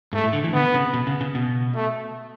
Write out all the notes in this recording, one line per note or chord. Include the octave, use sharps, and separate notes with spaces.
G#2 A3
A2
D3
E3
D3 B3
C#3
B2
C#3
C#3
B2
A3